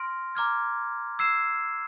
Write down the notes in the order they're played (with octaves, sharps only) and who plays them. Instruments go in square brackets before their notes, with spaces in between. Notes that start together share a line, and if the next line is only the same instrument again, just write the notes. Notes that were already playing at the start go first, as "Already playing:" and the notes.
Already playing: [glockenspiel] C6 F6 A#6 D7
A#5 D6 F6 G#6
E6 G#6 C7 E7